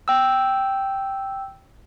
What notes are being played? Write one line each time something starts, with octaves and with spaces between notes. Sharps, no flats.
G5 E6